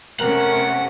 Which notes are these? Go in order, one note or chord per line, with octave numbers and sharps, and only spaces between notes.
C3 A3 C#4 A#4 F#5